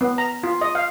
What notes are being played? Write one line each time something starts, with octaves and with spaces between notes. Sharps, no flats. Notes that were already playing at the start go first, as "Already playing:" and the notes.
B3
A#5
F4
D#5
F5